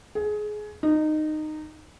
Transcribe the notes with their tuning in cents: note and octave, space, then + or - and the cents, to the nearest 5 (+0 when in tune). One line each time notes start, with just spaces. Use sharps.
G#4 +20
D#4 -15